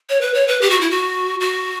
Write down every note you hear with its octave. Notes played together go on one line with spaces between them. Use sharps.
C#5
B4
C#5
B4
G4
F#4
E4
F#4
F#4